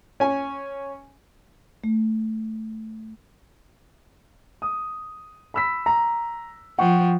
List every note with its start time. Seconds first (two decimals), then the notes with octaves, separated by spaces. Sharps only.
0.20 C#4 G#5
1.84 A3
4.62 D#6
5.54 B5 E6 B6
5.86 A#5
6.78 F3 F#5 G5 C#6